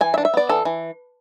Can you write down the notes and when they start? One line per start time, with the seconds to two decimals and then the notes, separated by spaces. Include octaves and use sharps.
0.01 E3 G#5
0.14 E5
0.18 D4
0.25 E5
0.34 B3 D5
0.49 E3 A4
0.65 E3